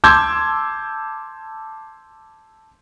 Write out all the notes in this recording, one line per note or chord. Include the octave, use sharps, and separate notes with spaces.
A5 C6 D6 E6 G6 G#6